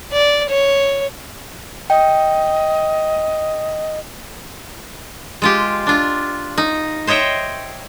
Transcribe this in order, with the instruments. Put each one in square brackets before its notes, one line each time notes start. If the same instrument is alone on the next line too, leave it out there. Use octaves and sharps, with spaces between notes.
[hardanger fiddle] D5
C#5
[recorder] D#5 [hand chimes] G5
[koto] G#3 F4 G4
D4 F4
D#4
C5 C#5 D#5 E5 G5